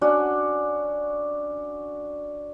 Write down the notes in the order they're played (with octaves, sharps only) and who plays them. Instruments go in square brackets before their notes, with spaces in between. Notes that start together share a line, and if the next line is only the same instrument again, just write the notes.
[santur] C#4 D4 F#4 F#5